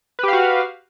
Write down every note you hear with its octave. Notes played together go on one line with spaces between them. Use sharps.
F#4 G4 B4 F5